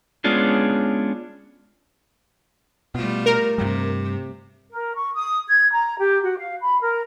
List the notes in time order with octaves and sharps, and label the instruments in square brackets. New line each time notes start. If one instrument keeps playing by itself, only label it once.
[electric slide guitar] G#3 B3 C#4 D4 F4 G#4
[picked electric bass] B2 [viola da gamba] G3 A3 F4
[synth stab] A#4
[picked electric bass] G2 G3 [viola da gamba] C3
[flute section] A#4
C#6
D#6
G#6
A#5
G4
F#4
F5
B5
A#4